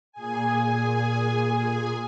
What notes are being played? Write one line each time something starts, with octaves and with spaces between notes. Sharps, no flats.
A#2 G#4 G#5